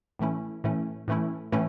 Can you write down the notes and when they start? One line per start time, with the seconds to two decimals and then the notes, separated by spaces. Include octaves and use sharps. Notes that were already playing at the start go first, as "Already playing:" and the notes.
0.19 A2 E3 A3 C#4 E4
0.64 A2 E3 A3 C#4 E4
1.08 A2 E3 A3 C#4 E4
1.52 A2 E3 A3 C#4 E4